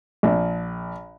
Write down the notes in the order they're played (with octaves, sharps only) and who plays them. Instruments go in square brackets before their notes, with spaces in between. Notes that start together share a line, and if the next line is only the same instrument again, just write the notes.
[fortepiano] A#1